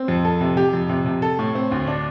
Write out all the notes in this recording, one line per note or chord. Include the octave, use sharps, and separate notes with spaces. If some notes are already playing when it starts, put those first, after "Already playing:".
Already playing: C4
F2
A4
C3
G4
F2
C3
C3
A4
A2
C4
D2
D4